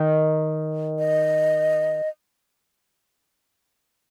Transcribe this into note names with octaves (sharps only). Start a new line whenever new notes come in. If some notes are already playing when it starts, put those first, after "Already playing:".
Already playing: D#3
D#5